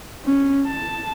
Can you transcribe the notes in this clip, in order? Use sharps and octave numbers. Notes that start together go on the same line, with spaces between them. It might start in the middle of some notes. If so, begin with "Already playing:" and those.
C#4
A5